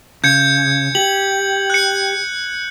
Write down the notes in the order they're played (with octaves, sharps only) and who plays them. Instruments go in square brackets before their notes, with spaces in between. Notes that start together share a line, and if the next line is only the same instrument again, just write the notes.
[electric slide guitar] C#3 [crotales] G6 G#6 C#7
[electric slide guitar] G4 [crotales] F#7
[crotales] F#6 C#7